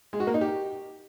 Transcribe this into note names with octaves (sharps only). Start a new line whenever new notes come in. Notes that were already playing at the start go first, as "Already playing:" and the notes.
G#3
F#4
A#3
D#4
G4